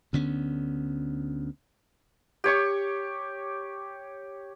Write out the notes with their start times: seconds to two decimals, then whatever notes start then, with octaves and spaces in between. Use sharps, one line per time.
0.13 D2 D3 B3 C#4
2.44 G4 C#5 C#6